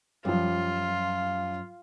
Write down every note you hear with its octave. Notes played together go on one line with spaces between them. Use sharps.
F#2 F3 G3 F4